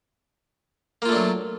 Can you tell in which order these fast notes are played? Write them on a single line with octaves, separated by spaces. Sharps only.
A#3 F4 A3 D4 F#3